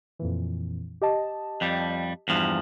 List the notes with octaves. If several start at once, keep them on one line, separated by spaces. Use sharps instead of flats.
F2 A#2 E3
G4 D#5 A5
F2 G3
E2 G2 F3